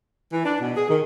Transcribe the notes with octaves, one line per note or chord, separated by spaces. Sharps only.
E3
D4
B2
G#4
D#3